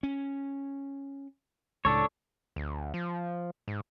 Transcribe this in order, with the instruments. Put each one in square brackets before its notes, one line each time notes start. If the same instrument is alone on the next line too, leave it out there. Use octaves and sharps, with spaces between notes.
[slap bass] C#4
[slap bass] C#2 A2 [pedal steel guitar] D4 A4 C#5
[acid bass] D2
F3
G#2